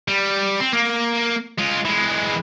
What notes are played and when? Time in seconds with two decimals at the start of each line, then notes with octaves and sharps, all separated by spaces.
0.08 G3
0.60 C4
0.73 A#3
1.58 G#3 F4
1.85 E3 G#3